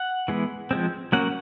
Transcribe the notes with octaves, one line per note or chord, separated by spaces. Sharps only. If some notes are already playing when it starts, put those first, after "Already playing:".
Already playing: F#5
E3 G#3 B3
F3 G#3 C4
F#3 A#3 C#4 F#5